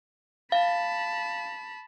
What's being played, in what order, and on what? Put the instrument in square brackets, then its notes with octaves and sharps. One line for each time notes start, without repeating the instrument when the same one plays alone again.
[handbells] F5 [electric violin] A5 B5